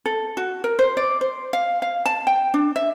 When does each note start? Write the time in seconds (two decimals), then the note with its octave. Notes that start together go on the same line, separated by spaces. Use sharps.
0.06 A4
0.37 F#4
0.64 A#4
0.79 C5
0.97 D5
1.21 C5
1.53 F5
1.82 F5
2.06 A5
2.27 G5
2.54 D4
2.76 E5